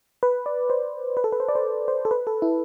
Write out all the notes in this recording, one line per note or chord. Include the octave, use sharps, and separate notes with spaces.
B4
D5
C5
B4
A4
B4
C5
D5
C5
C5
A4
B4
A4
E4